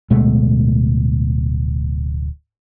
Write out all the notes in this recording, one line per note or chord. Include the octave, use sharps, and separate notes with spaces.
D1 B2 G#3 A3